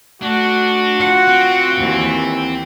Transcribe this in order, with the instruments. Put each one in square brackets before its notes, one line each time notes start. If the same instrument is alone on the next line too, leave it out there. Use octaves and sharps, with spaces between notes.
[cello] A3 [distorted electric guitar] D4 [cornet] F#4
[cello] F4 F#5
[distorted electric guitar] C4
[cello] D#2 E3